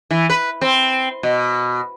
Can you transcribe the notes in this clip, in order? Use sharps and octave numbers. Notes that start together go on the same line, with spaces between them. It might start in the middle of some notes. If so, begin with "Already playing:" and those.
E3
B4
C4
B2